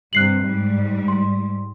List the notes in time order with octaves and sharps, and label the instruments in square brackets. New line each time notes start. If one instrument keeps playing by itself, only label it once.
[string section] G2 C3 [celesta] F#6 C7 F#7
[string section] G#2 G3
[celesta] C6